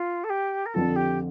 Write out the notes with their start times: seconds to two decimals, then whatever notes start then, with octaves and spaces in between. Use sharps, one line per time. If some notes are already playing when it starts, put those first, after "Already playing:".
Already playing: F4
0.24 A4
0.29 G4
0.66 A#4
0.74 F2 D3 F3 C4 F4 A4
0.96 G4